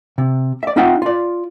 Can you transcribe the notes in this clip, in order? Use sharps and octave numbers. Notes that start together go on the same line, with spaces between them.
C3
D5 E5
C4 D#4 F4 E5 F#5 G5
F4 D5